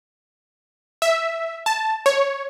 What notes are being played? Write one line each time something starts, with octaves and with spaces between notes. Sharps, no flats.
E5
A5
C#5